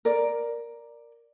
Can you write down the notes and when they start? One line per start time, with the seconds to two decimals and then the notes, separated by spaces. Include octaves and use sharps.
0.05 A#4 D5